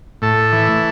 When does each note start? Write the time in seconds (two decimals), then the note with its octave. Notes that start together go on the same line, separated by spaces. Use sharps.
0.22 A2 A4
0.52 E3